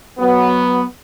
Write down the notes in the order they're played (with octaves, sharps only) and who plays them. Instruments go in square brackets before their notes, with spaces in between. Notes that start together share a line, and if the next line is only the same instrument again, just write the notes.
[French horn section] F#3 B3